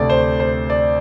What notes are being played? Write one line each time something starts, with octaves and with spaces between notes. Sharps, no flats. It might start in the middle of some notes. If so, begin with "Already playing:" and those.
Already playing: D2 C3 A3 D5
C5
C5
D5